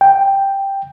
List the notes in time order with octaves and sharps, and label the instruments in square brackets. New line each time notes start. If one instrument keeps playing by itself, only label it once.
[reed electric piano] G5